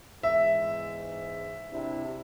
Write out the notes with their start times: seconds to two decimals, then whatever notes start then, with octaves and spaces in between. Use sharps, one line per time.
0.23 E2 G#2 E5
1.73 C3 D4 E4